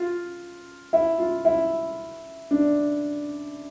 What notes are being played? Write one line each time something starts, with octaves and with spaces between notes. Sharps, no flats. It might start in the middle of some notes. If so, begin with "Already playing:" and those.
Already playing: F4
E4
F4
E4
D4